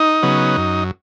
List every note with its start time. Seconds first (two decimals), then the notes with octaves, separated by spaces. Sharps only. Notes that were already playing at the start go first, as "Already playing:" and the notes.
Already playing: D#4
0.23 C#3 F#3 B3
0.57 F#2